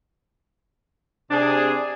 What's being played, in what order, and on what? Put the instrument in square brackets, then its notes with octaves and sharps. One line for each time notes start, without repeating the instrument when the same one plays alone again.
[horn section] C3 D4 G#4